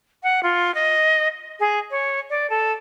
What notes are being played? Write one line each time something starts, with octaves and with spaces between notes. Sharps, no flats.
F#5
F4
D#5
G#4
C#5
D5
A4